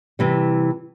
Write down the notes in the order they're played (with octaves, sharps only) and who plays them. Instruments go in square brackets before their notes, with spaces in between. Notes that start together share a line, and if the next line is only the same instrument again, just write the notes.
[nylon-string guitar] C3 E3 G3